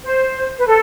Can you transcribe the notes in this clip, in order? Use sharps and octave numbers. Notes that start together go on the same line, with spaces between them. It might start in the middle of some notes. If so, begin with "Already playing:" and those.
C5
B4
A4